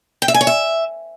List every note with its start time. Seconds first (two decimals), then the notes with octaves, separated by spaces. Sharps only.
0.22 G5
0.28 E5
0.34 G#5
0.41 C#5
0.47 E5